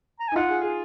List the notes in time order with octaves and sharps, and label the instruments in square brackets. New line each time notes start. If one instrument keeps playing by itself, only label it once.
[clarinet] A#5
G#5
[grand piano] D#4
[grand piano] F4 [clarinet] F#5
[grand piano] G#4
G#4